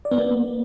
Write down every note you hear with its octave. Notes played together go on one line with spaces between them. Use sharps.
D5
B3
A#3